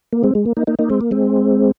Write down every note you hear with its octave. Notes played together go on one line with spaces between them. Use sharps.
A#3
G#3 C4
G#3
A#3
A#3 D#4
A#3 D#4
A#3 D#4
G#3 C4
A#3
G#3 C4